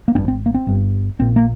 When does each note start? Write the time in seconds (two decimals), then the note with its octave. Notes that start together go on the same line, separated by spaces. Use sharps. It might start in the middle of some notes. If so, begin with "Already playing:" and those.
0.08 A#3
0.15 G#1 C4
0.18 G2
0.28 C4
0.46 A#3
0.54 C4
0.67 G1 G2
1.19 A#1 A#2 C4
1.36 A#3